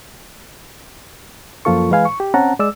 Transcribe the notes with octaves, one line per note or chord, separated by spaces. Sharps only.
F#2 F3 A#3 F4 A4 C#6
E3 G#3 B4 F5 G#5
C#6
G4
C4 C#4 F#5 A5 A#5
G#3 D5 E6